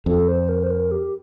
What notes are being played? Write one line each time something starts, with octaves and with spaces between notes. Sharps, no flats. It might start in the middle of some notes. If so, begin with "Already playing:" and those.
F2 A4
C5
A#4
C5
A#4
G4